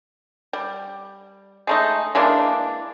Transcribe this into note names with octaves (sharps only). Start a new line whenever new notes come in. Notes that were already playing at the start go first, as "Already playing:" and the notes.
G3
G#3 A3 D#4
E3 G#3 A#3 D4